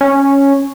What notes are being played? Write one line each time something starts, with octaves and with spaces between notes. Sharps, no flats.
C#4